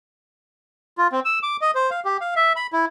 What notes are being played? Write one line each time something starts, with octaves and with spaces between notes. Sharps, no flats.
F4
C4
E6
D6
D#5
C5
F5
G4
F5
E5
B5
E4